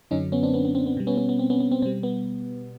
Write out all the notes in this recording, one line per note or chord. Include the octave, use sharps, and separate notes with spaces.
F#2 D3 F#3 C#4 D#4
B3 C#4
C4 D4
B3 C#4
B3
C4
B3
B2 G3
B3 C#4
B3 C#4
B3
C4
B3 C#4
B3
C4
B2 G3 C4
B3